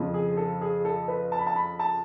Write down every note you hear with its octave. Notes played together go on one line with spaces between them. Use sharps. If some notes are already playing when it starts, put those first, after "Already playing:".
Already playing: F2 C#3 F3
G#4
A4
G#4
A4
B4
A5
B5
A5
B5
A5